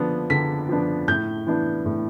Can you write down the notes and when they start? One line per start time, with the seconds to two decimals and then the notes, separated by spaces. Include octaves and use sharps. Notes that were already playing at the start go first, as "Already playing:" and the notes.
Already playing: D3 F3 B3 D4
0.30 D3 B6
0.69 F3 B3 D4
1.08 A2 G6
1.47 E3 B3 D4
1.86 A2